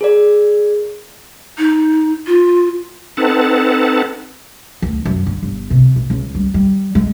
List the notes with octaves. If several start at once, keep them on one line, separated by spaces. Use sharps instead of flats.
G#4 A#4 D5
D#4
F4
C4 D#4 A4 B4 F#5 A5
D2
F#2
D3
G1
C3
A#1
C#2
G3
G3
G#3